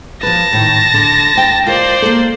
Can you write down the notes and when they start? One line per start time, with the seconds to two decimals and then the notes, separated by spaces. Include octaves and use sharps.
0.23 F3 B4 A5 A#6
0.53 A2 D#3
0.94 D3
1.36 D2 G5
1.66 F4 A#4 C5 D5 D#5
2.02 A#3 A4